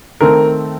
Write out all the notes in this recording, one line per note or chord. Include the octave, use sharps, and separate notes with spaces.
D#3 A3 C4 A#4